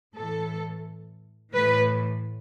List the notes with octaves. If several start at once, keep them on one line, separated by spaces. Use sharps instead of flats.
A2 E3 A4
A2 E3 B4